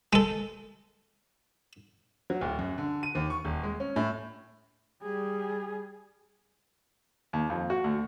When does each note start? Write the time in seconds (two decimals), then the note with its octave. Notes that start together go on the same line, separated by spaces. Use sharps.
0.13 G#3 A4
2.30 F#3
2.41 D1
2.59 F#2
2.78 D3
3.03 D#7
3.15 D#2
3.30 C#6
3.45 D#1
3.63 G#3
3.80 C#4
3.96 A2
5.02 G3 G#4
7.33 D#2
7.50 F2
7.70 F#4
7.84 D2